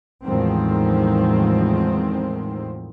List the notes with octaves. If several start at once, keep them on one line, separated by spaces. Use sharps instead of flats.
E2 A2 D#3 F3 G#3 C4